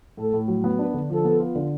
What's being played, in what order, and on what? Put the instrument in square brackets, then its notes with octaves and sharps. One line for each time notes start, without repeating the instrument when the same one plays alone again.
[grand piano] A2 [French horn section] A4
[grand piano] A2
F#3
B3
[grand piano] D4 [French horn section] B4
[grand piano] D3
[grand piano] F3 [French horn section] A4
[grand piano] B3
F4
D3